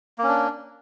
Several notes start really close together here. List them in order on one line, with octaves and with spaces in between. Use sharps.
A#3 C#4 D4